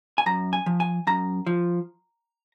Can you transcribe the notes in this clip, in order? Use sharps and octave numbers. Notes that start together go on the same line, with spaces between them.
G#5
F#2 A#5
G#5
F3
G#5
F#2 A#5
F3